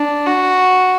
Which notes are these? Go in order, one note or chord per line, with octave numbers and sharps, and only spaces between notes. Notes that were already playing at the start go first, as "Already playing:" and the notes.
Already playing: D4
F#4